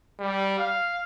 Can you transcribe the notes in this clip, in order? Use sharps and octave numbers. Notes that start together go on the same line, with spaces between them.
G3
F5